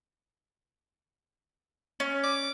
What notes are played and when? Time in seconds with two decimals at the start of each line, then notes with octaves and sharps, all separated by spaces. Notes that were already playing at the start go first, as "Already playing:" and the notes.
2.00 C#4
2.24 D6